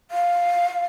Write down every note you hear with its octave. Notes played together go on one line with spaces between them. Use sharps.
F5